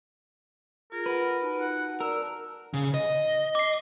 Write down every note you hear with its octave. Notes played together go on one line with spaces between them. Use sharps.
F4 G#4 A#4
F4 B4 F#5
D#4 F#4 A5
F#5
A#4 D5 A5 E6
C#3
D#5
D6 C7